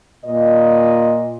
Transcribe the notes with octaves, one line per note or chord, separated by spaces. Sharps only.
A#2 D#5